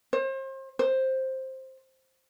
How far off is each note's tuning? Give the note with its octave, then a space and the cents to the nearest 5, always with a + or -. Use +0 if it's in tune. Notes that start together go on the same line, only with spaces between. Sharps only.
C5 +35
C5 +10